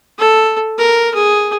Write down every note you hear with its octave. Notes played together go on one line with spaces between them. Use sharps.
A4
A#4
G#4